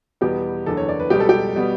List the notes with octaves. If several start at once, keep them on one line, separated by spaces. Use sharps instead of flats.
E2 B2 G3 B3 G4
F#1 E2 D3 A4
C#5
D5
B4
C#2 B2 G3 G4
A4
G4
B2 G3 B3